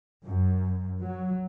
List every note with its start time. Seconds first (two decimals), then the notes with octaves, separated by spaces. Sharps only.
0.23 F#2
1.03 F#3